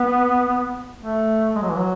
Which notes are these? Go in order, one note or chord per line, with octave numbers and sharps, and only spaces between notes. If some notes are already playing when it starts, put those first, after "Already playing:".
Already playing: B3
A3
G#3
F#3
E3
F#3